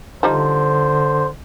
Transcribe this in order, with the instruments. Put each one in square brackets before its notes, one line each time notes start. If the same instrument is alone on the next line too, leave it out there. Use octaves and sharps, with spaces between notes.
[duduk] D3 [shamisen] F3 G3 D#4 [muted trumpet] C5